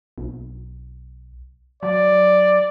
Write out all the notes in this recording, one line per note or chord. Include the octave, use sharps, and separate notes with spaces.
B1
F#3 D5